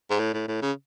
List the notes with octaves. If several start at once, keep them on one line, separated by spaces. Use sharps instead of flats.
G#2
A2
A2
A2
C#3